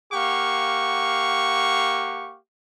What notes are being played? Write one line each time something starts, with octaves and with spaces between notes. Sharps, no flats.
A#3 G4 F5 F#5 C#6